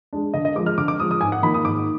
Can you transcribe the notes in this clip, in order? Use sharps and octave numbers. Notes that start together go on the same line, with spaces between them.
G#3 D4
D3 D#5
D#5
F3 G#3 D6
F6
D3 D6
D6
F3 G#3 D#6
D#6
G#2 G#5
F#5
D#3 A#3 D#4 B5
D#6
G#2 D6